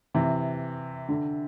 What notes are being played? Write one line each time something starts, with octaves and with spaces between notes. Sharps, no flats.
C3 E3
D3